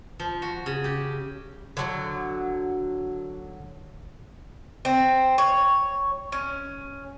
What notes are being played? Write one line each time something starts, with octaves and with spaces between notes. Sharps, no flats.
F3
F#4
C#3
G4
D3 F#3
C4
C#5
C#4